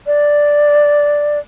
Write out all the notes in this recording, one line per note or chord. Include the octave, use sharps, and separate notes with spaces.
D5